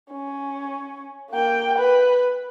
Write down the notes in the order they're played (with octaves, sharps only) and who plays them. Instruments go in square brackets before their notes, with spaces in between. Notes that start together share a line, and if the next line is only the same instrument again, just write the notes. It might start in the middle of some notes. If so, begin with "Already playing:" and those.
[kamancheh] C#4
A#3 G5
B4